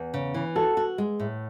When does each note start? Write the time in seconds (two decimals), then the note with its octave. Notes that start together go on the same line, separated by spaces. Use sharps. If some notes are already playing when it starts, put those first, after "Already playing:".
Already playing: E2
0.14 C#3
0.34 E3
0.56 F#4 A4
0.77 F#4
0.98 G#3
1.20 A2